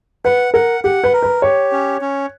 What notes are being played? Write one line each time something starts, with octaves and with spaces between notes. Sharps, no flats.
B4 F#5
A#4 F#5
G4 F#5
B4
A#4
B4
G4 C#5
C#4
C#4